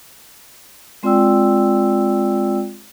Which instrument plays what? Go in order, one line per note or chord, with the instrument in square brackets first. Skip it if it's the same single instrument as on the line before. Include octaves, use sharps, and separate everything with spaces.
[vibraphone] G#3 C4 F4 D5 G5 E6